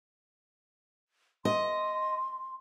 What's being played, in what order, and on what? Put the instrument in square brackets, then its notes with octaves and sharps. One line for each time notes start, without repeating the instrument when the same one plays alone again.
[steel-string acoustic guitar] D#5 [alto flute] C6